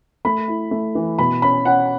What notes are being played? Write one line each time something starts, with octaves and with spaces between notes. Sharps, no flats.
A3 B5
E4
A3
E3
B2 B5
C#4 B5
C#4 F#5